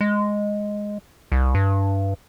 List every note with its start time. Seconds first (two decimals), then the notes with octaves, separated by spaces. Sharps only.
0.01 G#3
1.32 C2
1.55 G2